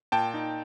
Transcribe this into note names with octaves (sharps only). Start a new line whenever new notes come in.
A#2 G5 A5
D#4